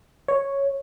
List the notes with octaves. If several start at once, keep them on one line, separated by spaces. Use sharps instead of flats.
C#5